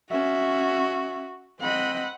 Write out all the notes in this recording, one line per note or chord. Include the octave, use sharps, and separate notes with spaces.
C#4 F#4 E5
C4 D#5 F#5 B5